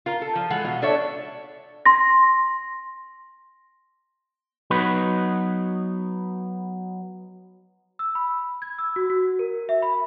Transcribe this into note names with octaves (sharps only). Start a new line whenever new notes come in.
F4 A#4
A4
F3
E3 G#3 A4 F#5
B2 F4
D4 A4 C#5 E5
C6 A#6
F#3 B3 D#4 B4
E6
B5
G#6
E6
F#4
F#4
A#4
E5
B5